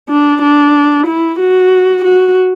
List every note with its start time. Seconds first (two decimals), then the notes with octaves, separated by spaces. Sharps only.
0.09 D4
0.42 D4
1.07 E4
1.40 F#4
2.04 F#4